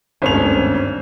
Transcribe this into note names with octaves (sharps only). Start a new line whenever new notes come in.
G#1 D2 G2 C#4 F7